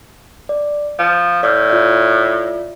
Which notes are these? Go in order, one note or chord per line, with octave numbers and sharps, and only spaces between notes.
D5
F3 F5
A2 D5 F6 G6
F4 D5 E5